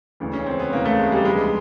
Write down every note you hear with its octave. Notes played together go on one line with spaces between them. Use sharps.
E1 D2 C#3 E3
C#4
C4
B3
E1 D2 C#3 E3 A#3
A3
G#3
G3
E1 D2 D3 F3 G#3